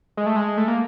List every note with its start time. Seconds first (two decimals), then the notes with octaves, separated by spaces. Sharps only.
0.17 G#3
0.27 A3
0.36 G#3
0.58 A3
0.68 A#3